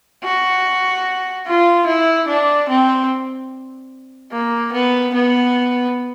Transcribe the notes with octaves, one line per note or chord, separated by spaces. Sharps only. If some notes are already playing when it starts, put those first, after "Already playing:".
F#4
F4
E4
D4
C4
A#3
B3
B3